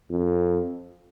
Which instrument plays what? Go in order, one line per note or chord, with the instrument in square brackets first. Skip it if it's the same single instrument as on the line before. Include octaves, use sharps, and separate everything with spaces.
[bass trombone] F2